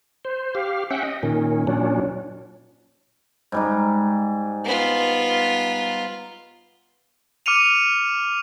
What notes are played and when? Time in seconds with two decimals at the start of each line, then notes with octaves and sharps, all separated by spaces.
0.25 C5
0.55 G4 F5
0.91 C#4 E5 F#5 G5
1.03 D#5
1.23 A#2 D#3 C#4
1.67 A#2 F#3 C#4 D4
3.52 G#2 G3 D#4
4.65 B3 F4
7.46 D6 F6 C#7 D#7 F7